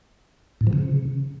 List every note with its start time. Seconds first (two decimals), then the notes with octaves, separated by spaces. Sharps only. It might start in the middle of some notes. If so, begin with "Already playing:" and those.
0.61 A2
0.67 F3
0.73 C#3